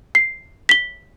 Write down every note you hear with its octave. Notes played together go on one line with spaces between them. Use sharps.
C7
B6 G7